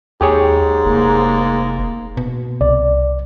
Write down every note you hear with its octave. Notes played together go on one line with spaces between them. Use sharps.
D#2 G#2 G4 G#4 C#5
F1 A#3
B2
C2 D5